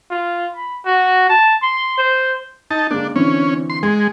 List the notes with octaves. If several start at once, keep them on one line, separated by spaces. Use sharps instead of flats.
F4
B5
F#4
A5
C6
C5
D#4 A5
D3 G#3 A#3 D4
D3 E3 C4 C#4
C6
G#3 C6